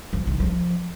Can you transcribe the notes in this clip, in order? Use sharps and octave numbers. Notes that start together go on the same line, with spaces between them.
F3
D#3
F3